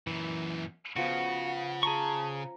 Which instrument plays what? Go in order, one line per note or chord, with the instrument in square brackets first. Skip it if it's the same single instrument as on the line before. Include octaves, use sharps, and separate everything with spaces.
[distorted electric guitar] F#2 A#2 [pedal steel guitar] E3
[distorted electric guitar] C#3 [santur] F3 B3 C#4 [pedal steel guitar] F#4 [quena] F#5
[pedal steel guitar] G#4 C#6 [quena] A5 [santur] A#5